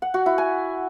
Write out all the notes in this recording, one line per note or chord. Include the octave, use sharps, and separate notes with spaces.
F#5
F#4
E4
G#5